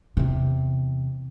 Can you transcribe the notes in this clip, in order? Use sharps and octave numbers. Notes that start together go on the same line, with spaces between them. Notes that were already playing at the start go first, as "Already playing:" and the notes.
E2 C3